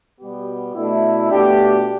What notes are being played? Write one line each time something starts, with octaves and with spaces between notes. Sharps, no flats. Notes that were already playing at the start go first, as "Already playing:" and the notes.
B2 G3 B3 G4
B2 A3 D4 E4
B2 A3 D4 G4